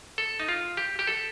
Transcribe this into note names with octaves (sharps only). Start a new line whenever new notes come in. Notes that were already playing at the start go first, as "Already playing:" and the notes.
A4
D#4
F4
G4
G4
A4